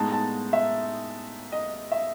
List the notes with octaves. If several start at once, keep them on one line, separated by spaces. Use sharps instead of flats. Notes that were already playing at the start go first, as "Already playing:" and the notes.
Already playing: A2 G#3 B3 D#4 A5
A5
E5
D#5
E5